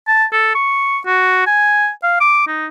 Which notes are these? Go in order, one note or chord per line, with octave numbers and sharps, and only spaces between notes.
A5
A4
C#6
F#4
G#5
F5
D6
D#4